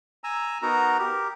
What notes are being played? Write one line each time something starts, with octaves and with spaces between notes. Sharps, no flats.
G#5 A#5 E6
B3 D#4 F#4 A#4 A#5
G4 A#4